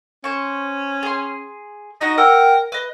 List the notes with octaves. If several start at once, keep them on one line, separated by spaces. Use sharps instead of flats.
C#4 C5 C#6
G#4 C6
D#4 F#4 D#5
A#4 F#5 G5 E6
B4 D#5